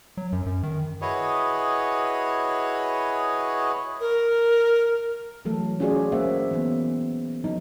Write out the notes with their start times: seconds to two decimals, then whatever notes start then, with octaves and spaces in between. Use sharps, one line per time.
0.17 F#3
0.32 F#2
0.46 F#2
0.63 D#3
1.01 E4 F#4 G#4 B4 C#5 D#5
4.00 A#4
5.45 E3 F#3 A3 A4
5.80 C#4 F4 F#4 G#4 C#5 D5
6.12 G#3 A#3 C5 E5 F#5
6.51 E3 B3
7.44 F#3 D#4